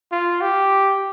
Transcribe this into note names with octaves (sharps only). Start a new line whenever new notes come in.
F4
G4